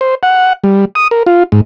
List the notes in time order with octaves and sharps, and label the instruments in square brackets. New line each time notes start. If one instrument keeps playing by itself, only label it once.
[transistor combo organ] C5
F#5
G3
D#6
A#4
F4
G#2